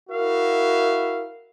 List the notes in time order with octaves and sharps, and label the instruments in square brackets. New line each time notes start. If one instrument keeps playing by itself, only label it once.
[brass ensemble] E4 F#4 A#4 E5 F5